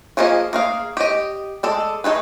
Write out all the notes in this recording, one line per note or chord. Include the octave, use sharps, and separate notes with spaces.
F3 A#3 F4 G#4 D#5
A#3 G#4 F5
G4 D#5
G#3 A4 D5
A3 D#4 G#4 B4